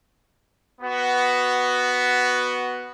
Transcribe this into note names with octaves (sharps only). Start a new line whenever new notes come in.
B3 F#4